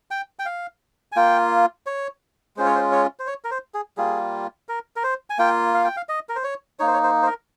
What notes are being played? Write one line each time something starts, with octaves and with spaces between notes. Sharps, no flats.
G5
G5
F5
G#5
A#3 F4 G5
C#5
G#3 C#4 F4 C5
C#5
C5
C#5
C5
C#5
A#4
C5
G#4
G3 A#3 F4 G#4
A#4
A#4
C5
G#5
A#3 F4 G5
F5
G5
F5
D#5
A#4
C5
C#5
A#3 D#4 C#5
C5
C#5
C5
C5
A#4